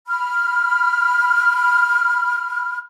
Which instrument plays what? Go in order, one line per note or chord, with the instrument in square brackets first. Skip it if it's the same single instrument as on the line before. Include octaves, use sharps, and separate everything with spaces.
[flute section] B5 F6